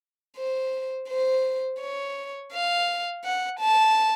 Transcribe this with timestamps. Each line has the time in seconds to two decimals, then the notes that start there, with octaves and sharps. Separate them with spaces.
0.37 C5
1.09 C5
1.80 C#5
2.53 F5
3.24 F#5
3.60 A5